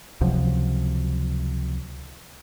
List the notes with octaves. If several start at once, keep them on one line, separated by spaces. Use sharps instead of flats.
C#2 C3 F3 F#3